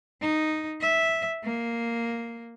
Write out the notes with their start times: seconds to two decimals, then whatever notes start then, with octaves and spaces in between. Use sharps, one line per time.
0.21 D#4
0.81 E5
1.44 A#3